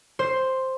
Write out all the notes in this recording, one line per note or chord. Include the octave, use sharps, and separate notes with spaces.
C5